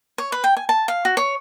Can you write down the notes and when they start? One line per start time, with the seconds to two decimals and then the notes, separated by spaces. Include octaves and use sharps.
0.18 C#5
0.32 B4
0.44 G5
0.57 G#5
0.69 A5
0.88 F5
1.05 F#4
1.17 C#5